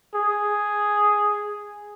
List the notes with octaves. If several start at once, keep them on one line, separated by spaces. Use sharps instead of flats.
G#4